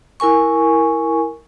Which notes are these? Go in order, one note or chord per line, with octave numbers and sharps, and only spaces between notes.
E4 A#4 G#5 C#6